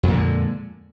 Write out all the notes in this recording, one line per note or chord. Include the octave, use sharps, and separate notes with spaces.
F2 A#2 D3 G#3